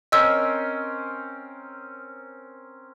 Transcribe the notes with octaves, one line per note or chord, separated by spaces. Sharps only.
C4 C#4 A#4 D#5 E6